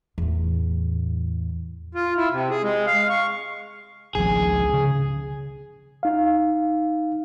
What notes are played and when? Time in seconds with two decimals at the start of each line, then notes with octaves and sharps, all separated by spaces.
0.18 E2 A2
1.95 F4
2.17 E4
2.31 C3
2.51 G#4
2.63 G#3
2.87 F5
3.10 C#6
4.15 G#1 C#2 F3 G#4
4.73 C#3
6.03 D#4 F5